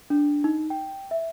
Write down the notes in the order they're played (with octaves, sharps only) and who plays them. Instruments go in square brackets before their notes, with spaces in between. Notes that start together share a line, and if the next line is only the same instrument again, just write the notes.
[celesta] D4
D#4
G5
E5